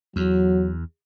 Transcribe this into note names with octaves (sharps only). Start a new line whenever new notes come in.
E2 F#3